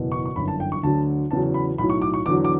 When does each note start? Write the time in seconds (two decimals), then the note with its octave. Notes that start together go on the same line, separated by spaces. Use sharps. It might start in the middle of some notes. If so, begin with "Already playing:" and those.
Already playing: F#1 E2 B2
0.12 C#6
0.26 C#6
0.36 G1 F#2 E3 B5
0.48 A5
0.60 G5
0.72 C#6
0.83 D2 D3 F#3 A5
1.31 E2 C#3 F#3 A5
1.54 B5
1.78 B1 A2 F#3 B5
1.90 C#6
2.02 D6
2.14 C#6
2.26 E2 D3 F#3 D6
2.45 D6